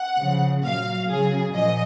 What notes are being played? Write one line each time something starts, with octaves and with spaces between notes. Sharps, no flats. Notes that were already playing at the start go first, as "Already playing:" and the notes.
Already playing: F#5
C#3 F3
A#2 F#3 F5
C#3 F#3 G#4
A#2 F3 D#5